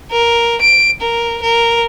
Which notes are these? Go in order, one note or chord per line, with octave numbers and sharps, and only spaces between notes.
A#4
D7
A#4
A#4